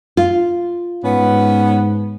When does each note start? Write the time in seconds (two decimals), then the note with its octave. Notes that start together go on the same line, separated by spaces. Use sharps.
0.17 F4
1.04 G#2 B3 C#4